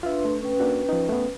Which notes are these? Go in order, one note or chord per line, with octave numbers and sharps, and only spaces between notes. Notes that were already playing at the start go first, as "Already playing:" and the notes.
D4 F4 B4 E5 C6
A3
C#4 B4 G5
A#3 D4 F#4
F3 D#4
A3 B3